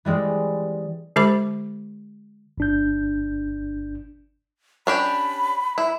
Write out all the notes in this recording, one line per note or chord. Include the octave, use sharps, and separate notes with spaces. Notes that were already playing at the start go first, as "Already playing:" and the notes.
E3 G3 G#3 C4
D3 G#3 G4 C5 B5 D6
G1 D4 G6
C#4 D4 G4 B5
E4